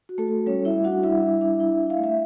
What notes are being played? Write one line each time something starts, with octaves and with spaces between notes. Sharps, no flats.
F#4
A3 A4
F#4
G3 C#4 C#5
G3 E4 E5
D4 F#4 F#5
G3 E4 E5
G3
D4
E4
E4
F5
A3
E5